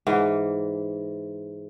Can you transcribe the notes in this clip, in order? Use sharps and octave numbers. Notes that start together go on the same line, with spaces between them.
G#2 E3